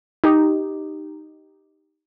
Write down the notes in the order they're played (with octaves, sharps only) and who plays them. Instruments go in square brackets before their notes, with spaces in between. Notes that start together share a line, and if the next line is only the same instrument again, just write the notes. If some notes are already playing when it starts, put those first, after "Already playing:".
[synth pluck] D#4 G4